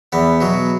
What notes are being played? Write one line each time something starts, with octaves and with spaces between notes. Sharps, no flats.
E2 B3
B2 F#3